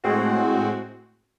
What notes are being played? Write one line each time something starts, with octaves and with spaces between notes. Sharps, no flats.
A2 G#3 C4 F#4